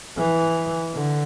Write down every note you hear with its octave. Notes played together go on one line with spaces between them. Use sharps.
E3
D3